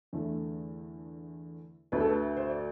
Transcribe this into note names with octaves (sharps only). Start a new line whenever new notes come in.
E2 D3 A3
D2 D3 A3 B4
A4
B4
C5
D5